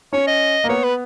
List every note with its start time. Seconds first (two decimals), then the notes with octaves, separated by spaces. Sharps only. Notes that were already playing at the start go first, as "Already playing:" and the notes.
0.13 C#4 C#5
0.27 D#5
0.64 A#3
0.69 B3 C#5
0.84 B4